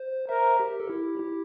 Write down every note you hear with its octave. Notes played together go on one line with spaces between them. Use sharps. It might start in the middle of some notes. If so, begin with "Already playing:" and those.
Already playing: C5
A#4 C5 E5
G4 A#4
A4
E4 G4
E4 G4